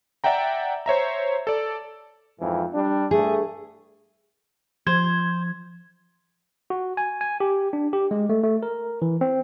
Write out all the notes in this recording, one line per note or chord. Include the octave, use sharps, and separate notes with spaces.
D5 E5 F#5 G5 A#5
C5 C#5 E5 A#5
A4 D5
F2 G#2 E3
G3 D4
G2 A3 G#4
F3 C5 G#6
F#4
G#5
G#5
G4
D4
G4
G#3
A3
A3
A#4
E3
C4